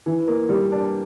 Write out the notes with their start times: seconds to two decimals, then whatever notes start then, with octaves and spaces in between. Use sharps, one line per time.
0.06 E3
0.27 A#3
0.49 G3
0.72 D4